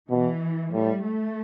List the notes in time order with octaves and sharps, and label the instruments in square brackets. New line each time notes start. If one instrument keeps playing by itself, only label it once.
[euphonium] B2 [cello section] E3
[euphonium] A2 [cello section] G3
[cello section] A3